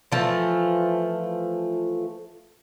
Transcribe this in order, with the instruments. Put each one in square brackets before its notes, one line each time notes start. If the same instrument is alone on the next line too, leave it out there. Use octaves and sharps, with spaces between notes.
[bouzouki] E3 F3 A3